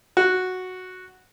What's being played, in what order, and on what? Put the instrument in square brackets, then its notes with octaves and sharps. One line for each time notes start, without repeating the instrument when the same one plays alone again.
[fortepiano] F#4